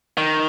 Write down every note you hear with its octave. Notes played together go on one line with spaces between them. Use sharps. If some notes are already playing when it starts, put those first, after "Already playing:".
D#3